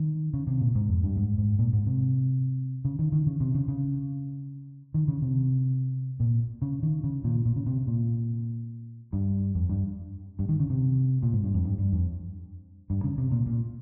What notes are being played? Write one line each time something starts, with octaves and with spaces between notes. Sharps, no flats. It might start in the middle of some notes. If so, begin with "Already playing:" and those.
Already playing: D#3
C#3
C3
A#2
G#2
F2
G2
G#2
G#2
A#2
G#2
C3
C#3
D#3
D#3
C#3
C3
C#3
C#3
D#3
C#3
C3
A#2
C#3
D#3
C#3
A#2
A#2
C#3
C3
A#2
G2
F2
G2
G2
D#3
C#3
C3
A#2
G#2
G2
F2
G2
G2
F2
G2
C#3
C3
A#2
A#2